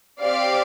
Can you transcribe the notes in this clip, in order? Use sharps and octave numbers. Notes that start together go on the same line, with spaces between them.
C4 G4 D5 F5